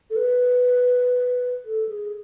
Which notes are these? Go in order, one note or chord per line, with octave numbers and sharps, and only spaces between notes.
A4
B4
A4
G#4